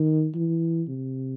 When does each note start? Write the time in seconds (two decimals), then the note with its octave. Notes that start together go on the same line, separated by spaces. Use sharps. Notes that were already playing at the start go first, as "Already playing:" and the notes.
Already playing: D#3
0.35 E3
0.88 C3